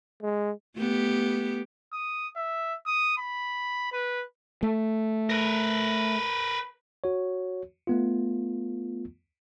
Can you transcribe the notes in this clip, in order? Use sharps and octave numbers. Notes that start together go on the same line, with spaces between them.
G#3
A3 B3 G4
D#6
E5
D#6
B5
B4
A3
A#4 B4
F#4 C#5
A3 B3 F4